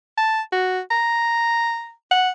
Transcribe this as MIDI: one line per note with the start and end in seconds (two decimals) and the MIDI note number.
0.17 0.41 81
0.52 0.80 66
0.91 1.91 82
2.11 2.29 78